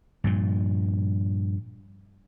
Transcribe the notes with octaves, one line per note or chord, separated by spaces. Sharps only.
G2 A#2 F3